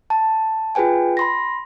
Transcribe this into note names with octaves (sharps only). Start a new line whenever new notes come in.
A5
F4 G#4 B4 G5 G#5
B5 C6 A#6